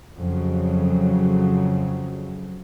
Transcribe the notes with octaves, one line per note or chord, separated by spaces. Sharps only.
F2 C#3 F#3